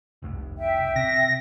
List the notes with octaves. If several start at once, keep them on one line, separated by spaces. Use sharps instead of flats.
F1 C2
E5 G5
C3 A#6